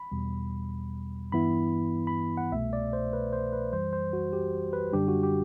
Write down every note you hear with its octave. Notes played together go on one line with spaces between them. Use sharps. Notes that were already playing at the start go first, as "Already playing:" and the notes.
Already playing: B5
E2 B2 G3
G2 E3 B3 E4 B5
B5
F#5
C2 B2 A3 E5
D5
C5
B4
C5
B4
F#2 E3 G3 C5
C5
F#4
G4
B4
F#2 D3 G3 D4 G4
F#4
G4